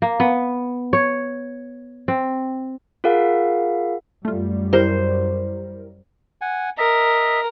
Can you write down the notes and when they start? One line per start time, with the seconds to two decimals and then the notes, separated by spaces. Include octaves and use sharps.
0.02 A#3
0.20 B3
0.93 C#5
2.08 C4
3.04 F4 G#4 A#4 F5 F#5
4.25 F#2 G3 A3 F4
4.73 E4 G4 A#4 C5
6.41 F#5 G#5
6.78 A#4 D#5 E5